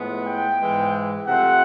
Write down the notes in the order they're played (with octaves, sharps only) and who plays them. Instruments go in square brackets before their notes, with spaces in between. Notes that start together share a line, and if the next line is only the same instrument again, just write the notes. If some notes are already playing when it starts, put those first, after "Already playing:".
Already playing: [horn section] A2 F3 G#3 B3
G5
G#2 E3 G#3
C3 F3 A3 C4 F#5